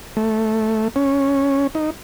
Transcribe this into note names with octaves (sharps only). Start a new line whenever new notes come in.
A3
C#4
D#4